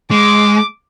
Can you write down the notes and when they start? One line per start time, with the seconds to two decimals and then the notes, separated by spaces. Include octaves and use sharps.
0.11 G#3 D6